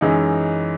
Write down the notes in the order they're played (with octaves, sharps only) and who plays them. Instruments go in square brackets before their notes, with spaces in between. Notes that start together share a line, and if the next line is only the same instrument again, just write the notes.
[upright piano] F#2 E3 G#3 D#4